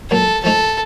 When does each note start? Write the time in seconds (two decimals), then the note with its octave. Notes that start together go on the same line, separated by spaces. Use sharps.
0.11 A#2 F#3 A#3 A4
0.44 F3 A3 D#4 A4